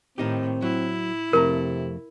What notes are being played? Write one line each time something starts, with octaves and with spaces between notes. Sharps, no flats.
A2 D#3 C4 D#4 G4
F#3 E4
F2 C3 A3 A#4 A#5